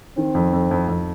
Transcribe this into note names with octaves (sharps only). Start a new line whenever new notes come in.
D#3 C4
F2
F2
F2
F2